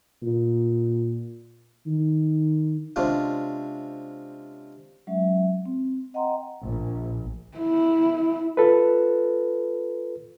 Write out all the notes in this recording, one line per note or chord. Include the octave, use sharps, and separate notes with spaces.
A#2
D#3
C3 G#3 C#4 D4 F4
F#3 G#3 C#4 E5
C4
D#5 F#5 G5 A#5 C6
A#1
E4
F4 A4 B4